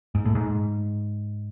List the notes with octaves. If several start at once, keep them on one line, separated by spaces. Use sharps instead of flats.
G#2
A2
G#2